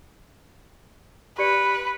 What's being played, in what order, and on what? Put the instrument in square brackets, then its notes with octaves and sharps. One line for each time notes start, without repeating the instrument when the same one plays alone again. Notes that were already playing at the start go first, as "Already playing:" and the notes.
[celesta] G4 D5 C#7 [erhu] B4